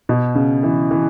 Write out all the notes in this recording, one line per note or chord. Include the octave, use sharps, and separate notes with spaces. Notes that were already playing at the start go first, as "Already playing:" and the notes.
B2
C#3
E3
E3